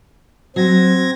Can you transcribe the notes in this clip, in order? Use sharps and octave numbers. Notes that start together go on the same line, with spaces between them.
F#3 C4 G#6 A#6